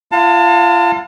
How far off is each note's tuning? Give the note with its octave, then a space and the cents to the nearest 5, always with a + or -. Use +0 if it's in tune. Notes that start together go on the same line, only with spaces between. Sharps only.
F4 -35 F5 +40 A5 +30